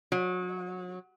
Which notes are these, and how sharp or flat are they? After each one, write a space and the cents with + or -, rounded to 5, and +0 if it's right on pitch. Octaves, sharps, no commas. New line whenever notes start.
F#3 -30